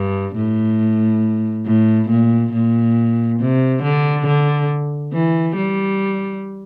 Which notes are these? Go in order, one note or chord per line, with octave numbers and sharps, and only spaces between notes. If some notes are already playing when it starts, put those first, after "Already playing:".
Already playing: G2
A2
A2
A#2
A#2
C3
D3
D3
E3
G3